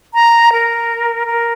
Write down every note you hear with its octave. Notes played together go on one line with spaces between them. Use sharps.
A#5
A#4
A#4